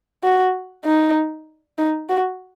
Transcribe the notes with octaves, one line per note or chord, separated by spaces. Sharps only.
F#4
D#4
D#4
F#4